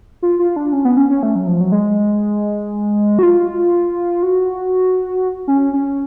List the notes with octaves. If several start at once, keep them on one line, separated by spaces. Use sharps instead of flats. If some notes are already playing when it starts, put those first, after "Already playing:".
F4
F4
D4
C#4
B3
C#4
C#4
A3
F#3
F3
F#3
G#3
F#4
F4
F#4
C#4
C#4